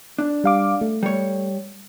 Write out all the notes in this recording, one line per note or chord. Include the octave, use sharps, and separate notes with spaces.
D4
G3 F5 D6
A3
G3 C#5